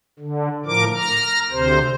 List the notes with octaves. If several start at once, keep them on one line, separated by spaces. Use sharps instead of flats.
D3
A2 F3 A#4 D6
A#5 F6
D2 C3 C5